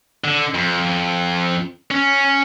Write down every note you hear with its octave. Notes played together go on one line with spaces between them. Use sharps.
D3
F2
C#4